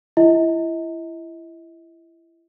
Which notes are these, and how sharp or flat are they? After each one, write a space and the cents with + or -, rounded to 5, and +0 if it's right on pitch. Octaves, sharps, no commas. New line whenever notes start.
E4 +30 D#5 +40